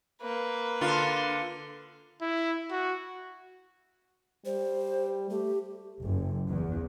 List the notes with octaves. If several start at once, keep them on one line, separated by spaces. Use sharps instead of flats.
A#3 B4
D3 F4
E4
F#4
G3 C5
A3 G4
F#1
E2